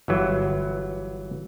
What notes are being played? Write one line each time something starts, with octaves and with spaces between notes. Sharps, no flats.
G1 E3 F#3